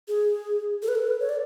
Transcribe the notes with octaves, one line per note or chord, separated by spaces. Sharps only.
G#4
A4
B4
A4
B4
C#5
D5